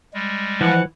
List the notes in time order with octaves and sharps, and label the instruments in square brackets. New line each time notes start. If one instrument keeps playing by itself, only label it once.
[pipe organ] G3 G#3
[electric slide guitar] E3 [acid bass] F3 [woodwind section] F#5